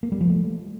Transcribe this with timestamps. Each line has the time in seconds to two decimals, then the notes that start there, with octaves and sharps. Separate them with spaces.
0.03 A#3
0.12 G3
0.21 F3
0.29 A3